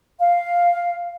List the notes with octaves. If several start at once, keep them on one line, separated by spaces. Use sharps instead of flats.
F5